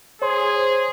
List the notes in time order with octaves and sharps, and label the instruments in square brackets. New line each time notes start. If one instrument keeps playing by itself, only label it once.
[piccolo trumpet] G#4 [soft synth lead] C5 [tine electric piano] C#5 C6